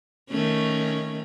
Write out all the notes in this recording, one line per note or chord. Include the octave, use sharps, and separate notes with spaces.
D#3 A3 C#4